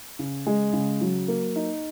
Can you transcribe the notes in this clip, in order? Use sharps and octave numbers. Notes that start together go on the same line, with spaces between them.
C#3
G#3
C#3
F#3
A#3
D#4